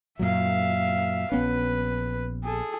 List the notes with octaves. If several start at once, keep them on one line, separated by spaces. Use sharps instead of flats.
F#2 A#2 F#3 E5 F5
A#1 B3 C#4 B4
G#4 A4